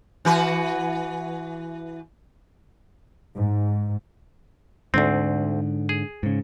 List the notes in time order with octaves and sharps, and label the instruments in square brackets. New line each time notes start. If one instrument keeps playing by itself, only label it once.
[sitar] E3 F#4 B4
[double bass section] G#2
[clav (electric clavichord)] D2 C4 [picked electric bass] G#2 D3
[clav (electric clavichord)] G#4
[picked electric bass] G#2 C#3